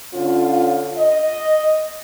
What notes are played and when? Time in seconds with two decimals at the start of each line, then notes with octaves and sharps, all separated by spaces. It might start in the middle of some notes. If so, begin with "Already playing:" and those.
0.14 D3 C#4 F4
0.97 D#5